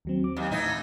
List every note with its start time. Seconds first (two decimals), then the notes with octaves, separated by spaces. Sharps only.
0.05 D#2 F#3 C4
0.24 D6
0.37 D#2
0.51 A2 E3 D#4